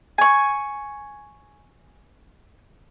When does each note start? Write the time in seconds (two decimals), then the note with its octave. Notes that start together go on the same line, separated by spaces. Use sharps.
0.18 G#5 C#6